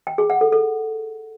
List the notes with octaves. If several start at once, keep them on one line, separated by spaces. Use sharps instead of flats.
G5
G#4
F#5
A4
A4